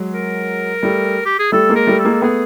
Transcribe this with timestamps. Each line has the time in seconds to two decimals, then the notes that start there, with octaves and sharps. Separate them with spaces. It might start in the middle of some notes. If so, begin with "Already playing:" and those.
Already playing: F#3 G#3
0.14 A#4
0.83 G3 A3
1.25 G4
1.39 G#4
1.52 G3 A3 A4
1.69 G#3 A#3
1.75 A#4
1.87 G3 A3
1.99 A4
2.05 G#3 A#3
2.13 A4
2.22 A3 B3 G#4